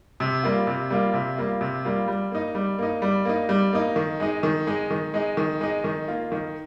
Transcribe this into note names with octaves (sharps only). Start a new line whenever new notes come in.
C3
G3 A#3 F4
C3
G3 A#3 F4
C3
G3 A#3 F4
C3
G3 A#3 F4
G3
A#3 D#4
G3
A#3 D#4
G3
A#3 D#4
G3
A#3 D#4
D#3
G#3 D#4
D#3
G#3 D#4
D#3
G#3 D#4
D#3
G#3 D#4
D#3
A#3 F4
D#3